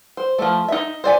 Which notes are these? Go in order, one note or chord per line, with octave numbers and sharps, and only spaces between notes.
C5
F3 A3
D#4 E5
C5 D5 G#5